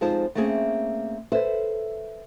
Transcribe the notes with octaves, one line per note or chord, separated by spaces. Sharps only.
F2 G#3 D#4 F4 C5 A5
A3 A#3 C4 C#4 G#4
A4 B4 C5 E5